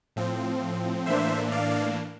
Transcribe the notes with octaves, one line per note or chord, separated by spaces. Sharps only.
A2 F3 C4
A2 E3 A#3 D4 C5 E5
D5 F5